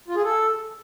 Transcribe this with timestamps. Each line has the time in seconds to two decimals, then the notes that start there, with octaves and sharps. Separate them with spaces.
0.08 F4
0.16 G#4
0.24 A4